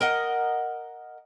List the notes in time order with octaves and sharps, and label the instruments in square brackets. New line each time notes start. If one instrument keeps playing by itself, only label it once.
[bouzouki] A#4 D#5 F#5